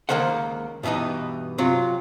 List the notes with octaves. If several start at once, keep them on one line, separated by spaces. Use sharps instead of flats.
C#2 B2 D#3 A#3 C5 F#5
G2 B2 E3 B3 D#4
C3 F#3 F4